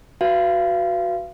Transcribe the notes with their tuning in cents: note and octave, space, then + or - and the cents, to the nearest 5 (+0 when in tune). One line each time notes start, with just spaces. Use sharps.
F#4 +0 B4 -10 F5 -35